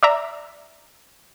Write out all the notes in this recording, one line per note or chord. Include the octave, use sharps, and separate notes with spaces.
D5 E5 A#5